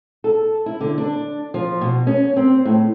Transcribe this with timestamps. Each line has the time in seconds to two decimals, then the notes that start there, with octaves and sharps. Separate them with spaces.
0.24 A4
0.66 E4
0.81 D3
0.98 D4
1.54 F3
1.81 B2
2.07 C#4
2.37 C4
2.65 A2